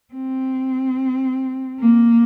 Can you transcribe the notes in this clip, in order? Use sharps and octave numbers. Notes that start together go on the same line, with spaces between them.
C4
A#3